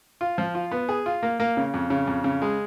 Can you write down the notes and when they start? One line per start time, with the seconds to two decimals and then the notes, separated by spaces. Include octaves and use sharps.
0.21 F4
0.38 F3
0.55 F4
0.71 B3
0.89 G#4
1.06 F4
1.23 A#3
1.40 A#3
1.57 C#3
1.74 F2
1.90 C#3
2.07 F2
2.24 C#3
2.42 G#3